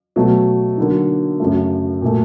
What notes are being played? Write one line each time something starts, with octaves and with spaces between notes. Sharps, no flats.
B2 F#3 A3
D3 F#3 A#3 D#4
F#2 C#3 F#3 A3
A#2 F#3 A3